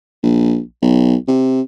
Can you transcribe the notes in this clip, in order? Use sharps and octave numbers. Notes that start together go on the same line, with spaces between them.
A#1
B1
C3